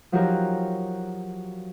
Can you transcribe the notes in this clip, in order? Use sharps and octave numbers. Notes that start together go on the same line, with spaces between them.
F3 F#3 D#4 F#4 G4 A#4